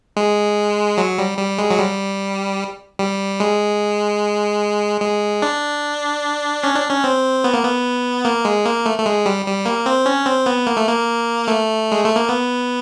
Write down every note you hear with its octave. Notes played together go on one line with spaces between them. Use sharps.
G#3
F#3
G3
G3
G#3
F#3
G3
G3
G#3
G#3
D4
C#4
D4
C#4
C4
B3
A#3
B3
A#3
G#3
A#3
A3
A3
G#3
G3
G3
A#3
C4
C#4
C4
B3
A#3
A3
A#3
A3
G#3
A3
A#3
B3